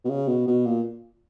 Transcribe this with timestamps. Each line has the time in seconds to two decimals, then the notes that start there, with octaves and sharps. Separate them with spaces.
0.05 B2
0.10 C#3
0.28 B2
0.47 B2
0.66 A#2